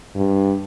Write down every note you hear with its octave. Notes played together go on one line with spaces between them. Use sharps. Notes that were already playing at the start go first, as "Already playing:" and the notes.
G2